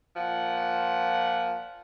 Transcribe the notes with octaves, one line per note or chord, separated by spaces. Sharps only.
A#2 F3 F#5